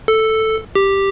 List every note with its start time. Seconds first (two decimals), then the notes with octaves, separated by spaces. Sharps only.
0.08 A4
0.75 G4